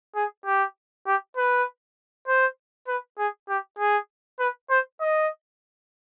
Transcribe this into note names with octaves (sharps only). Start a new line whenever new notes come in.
G#4
G4
G4
B4
C5
B4
G#4
G4
G#4
B4
C5
D#5